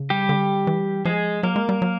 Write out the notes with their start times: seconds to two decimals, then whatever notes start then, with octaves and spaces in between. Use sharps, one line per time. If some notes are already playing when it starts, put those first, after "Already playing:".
Already playing: C#3
0.10 G3 G4
0.29 D3
0.67 E3
1.05 F3 G#3 G#4
1.43 F#3 A#3 A#4
1.56 G#3
1.69 G3
1.82 F#3